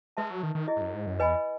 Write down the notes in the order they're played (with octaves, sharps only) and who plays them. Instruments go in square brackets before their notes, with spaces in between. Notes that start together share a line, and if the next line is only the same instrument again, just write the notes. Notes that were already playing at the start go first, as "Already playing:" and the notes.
[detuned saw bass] G#3 [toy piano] B4 E5 A5
[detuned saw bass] F#3
D#3
D#3
[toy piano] E4 G#4 D#5
[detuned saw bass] G#2
F#2
G#2
F#2
[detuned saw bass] E2 [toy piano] B4 D#5 G#5 B5